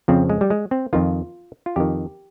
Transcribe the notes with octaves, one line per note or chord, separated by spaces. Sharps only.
F2 C#3 F3 C4
G#3
G3
G#3
C4
F2 D#3 F4
F4
F2 D#3 G4